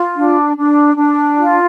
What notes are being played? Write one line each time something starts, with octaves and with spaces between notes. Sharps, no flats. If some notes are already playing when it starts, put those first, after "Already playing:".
Already playing: F4
D4
D4
D4
F4